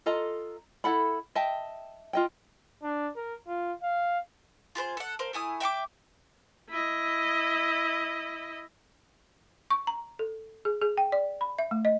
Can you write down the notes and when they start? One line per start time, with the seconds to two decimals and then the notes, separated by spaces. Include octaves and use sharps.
0.06 F4 A4 D#5 A#5
0.84 E4 A4 F#5 B5
1.35 D#5 E5 G5 A5
2.13 F4 D#5 G5
2.83 D4
3.16 A#4
3.47 F4
3.83 F5
4.75 F4 G#4 B4 C5
4.97 A4 F#5
5.19 A#4 C5 F5
5.33 A3 E4 G#5 D#6
5.60 E5 G5 C#6 D6
6.69 E4 D#5
9.70 C#6
9.87 A#5
10.19 A4
10.65 G#4
10.82 G#4
10.98 G5
11.12 D5
11.41 B5
11.59 E5
11.71 A3
11.85 D#5